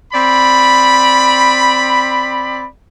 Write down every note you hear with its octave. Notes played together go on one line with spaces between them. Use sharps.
C4 D5 B5